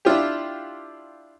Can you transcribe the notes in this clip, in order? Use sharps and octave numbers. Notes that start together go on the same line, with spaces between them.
D4 E4 F4 G4